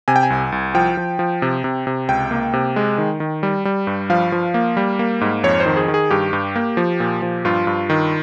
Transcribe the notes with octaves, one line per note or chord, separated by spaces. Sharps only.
C3 G#5
G5
G#5
C2
C2
F3 G5
F3
F3
C3
C3
C3
C#2 G5
A#3
C3
G#3
D#3
D#3
G3
G3
G2
F3 F5
F3
A#3
G3
A#3
G#2
F2 C#5
C5
D#3
G#4
D#3
G#4
G2 G4
G2
A#3
F3
A#2
F3
G2 F4
G2
D#3